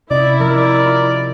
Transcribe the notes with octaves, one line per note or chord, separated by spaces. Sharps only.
C3 C#4 E4 D5 D#5
F3 A#4 D5
F4